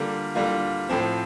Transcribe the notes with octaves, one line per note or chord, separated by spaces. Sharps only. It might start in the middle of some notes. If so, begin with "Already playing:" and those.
Already playing: D3 G3 A#3 F4
D3 G3 A#3 F4
A2 F3 C4